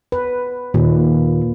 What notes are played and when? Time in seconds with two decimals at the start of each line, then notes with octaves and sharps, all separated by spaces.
0.12 B4
0.74 D#2 A#2